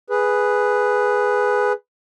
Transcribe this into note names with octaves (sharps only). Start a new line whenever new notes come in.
G#4 B4